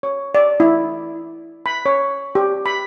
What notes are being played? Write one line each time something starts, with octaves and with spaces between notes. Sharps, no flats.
C#5
D5
E4
B5
C#5
G4
B5